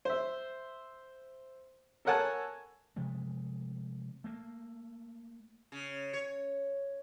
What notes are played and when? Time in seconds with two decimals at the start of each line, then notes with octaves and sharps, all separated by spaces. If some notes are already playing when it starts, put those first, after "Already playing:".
0.05 C5 E5
2.05 A4 A#4 C#5 F#5 G#5 A5
2.96 C3 F3 G#3 A3
4.24 A3 A#3
5.72 C#3
6.13 C#5